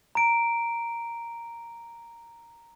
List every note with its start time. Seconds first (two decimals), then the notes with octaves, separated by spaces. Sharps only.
0.15 A#5 D7